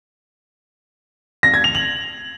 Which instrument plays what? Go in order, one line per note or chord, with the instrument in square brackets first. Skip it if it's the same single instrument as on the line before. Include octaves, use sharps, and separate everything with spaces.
[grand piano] A#6
G#6
F7
F#7